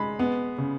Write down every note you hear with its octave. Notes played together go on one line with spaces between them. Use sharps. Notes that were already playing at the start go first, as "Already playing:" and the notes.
Already playing: G#3 B5
B3
C#3